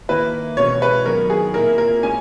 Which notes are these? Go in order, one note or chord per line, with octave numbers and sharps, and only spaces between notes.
D#3 A#3 E4 B4
E2 B2 G#3 C#4 F#4 C#5
B4
D#3 F#3 B3 F#4 A#4
G#4
A#2 A#3 E4 A#4
A#4
G#3 C#4 G#5